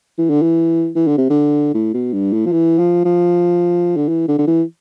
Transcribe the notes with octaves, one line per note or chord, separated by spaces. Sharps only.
E3
D3
E3
E3
D3
C3
D3
A2
B2
G2
A2
F3
E3
F3
F3
D3
E3
D3
D3
E3